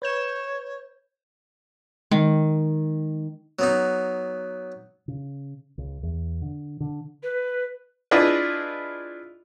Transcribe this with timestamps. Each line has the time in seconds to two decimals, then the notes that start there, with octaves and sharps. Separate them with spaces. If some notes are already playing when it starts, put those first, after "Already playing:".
0.02 B4 C#5 G6 E7
2.11 D#3 G#3
3.59 F#3 B3 D#4
5.08 C#3
5.78 C#2
6.03 E2
6.42 D3
6.80 D3
7.23 B4
8.11 D4 E4 F4 G#4 B4 D#5